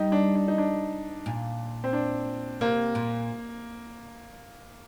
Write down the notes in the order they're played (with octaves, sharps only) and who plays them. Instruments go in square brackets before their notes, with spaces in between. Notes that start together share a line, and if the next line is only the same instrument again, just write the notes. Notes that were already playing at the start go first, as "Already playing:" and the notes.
Already playing: [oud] G3 [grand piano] D#4
[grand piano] D4
D4
D#4
D4
[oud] A#2
[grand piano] C4
D4
[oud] C3 [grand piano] A#3
[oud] A#2